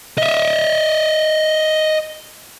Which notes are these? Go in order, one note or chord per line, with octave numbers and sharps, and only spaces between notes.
D#5 E5